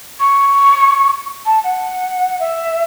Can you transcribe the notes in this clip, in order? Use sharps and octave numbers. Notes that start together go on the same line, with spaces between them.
C#6
A5
F#5
E5